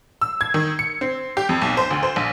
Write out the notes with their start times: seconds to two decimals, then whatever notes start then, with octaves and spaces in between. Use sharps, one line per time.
0.21 E6
0.41 G#6
0.54 D#3
0.79 C#7
1.01 C4
1.37 G4
1.49 F2
1.62 B1
1.77 C5
1.90 D2
2.03 C5
2.16 A#1